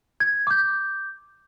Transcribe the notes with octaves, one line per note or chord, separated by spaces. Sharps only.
G#6
D6 G6